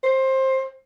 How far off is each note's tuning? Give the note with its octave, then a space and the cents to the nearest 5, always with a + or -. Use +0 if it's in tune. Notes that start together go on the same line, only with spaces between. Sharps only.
C5 +20